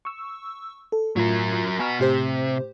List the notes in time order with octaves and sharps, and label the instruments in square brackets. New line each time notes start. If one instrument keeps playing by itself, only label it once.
[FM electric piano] C#6 E6
A4
[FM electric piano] A2 F4 G#6 [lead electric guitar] F#3 A#4
[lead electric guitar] B3 F#4 [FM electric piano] G#5 A#5 F6
[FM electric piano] A2 G4 C5 [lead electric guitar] C3